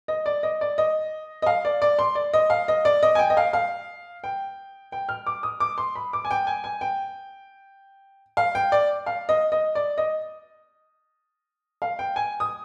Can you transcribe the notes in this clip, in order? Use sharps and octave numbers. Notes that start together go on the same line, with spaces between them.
D#5
D5
D#5
D5
D#5
D#5
F5
D5
D5
C6
D5
D#5
F5
D#5
D5
D#5
G#5
G5
D#5
F5
F5
G5
G5
F6
D6
D#6
D6
C6
B5
D6
G#5
G5
G#5
G#5
G5
F5
G5
D5
F5
D#5
D#5
D5
D#5
F5
G5
G#5
D#6